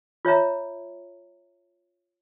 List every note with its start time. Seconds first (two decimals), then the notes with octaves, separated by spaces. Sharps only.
0.25 F4 C#5 E5 A#5